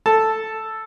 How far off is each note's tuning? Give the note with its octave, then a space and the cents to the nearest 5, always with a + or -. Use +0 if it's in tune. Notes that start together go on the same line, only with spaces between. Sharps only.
A4 +0 A5 +0